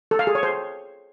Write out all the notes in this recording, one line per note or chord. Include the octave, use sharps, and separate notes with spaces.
A4
F5
G#4
C#5
C5